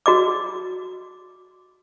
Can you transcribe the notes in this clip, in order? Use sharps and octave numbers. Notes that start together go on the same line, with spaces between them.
F#4 D#5 D6